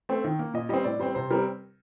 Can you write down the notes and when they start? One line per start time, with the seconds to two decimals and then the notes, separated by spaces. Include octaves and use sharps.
0.09 A3 C4
0.24 D#3
0.39 A#3
0.54 A#2 D#5
0.69 G3 C4 D#5
0.84 A2 D5
0.99 G3 C4 C5
1.15 C3 C5
1.31 G3 C4 A#4